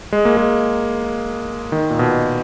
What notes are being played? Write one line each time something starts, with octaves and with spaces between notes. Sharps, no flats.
G#3
A#3
G#3
D#3
A#2
B2